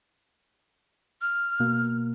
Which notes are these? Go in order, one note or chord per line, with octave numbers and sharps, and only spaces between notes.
F6
B2 A#3